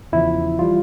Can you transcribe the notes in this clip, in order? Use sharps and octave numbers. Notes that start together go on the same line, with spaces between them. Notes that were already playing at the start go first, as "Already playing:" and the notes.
E2 C#3 F3 E4
E3 G3 F4